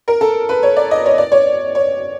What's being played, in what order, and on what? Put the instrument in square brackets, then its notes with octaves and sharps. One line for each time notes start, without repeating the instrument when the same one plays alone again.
[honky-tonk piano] A#4
A4
B4
C#5
D5
D#5
C#5
D5
C#5
C#5